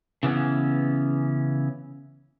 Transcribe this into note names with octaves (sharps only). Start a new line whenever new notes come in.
C#3 E3 B3 C#4